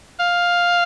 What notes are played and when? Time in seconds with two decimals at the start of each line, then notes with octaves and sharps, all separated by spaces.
0.20 F5